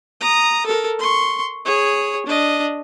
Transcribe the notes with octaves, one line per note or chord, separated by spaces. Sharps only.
A#5 D#6
A4 A#4
C6 C#6
G#4 C#5
D4 D#5